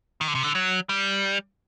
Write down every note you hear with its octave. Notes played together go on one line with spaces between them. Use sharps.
D#3
D3
C3
D3
F#3
G3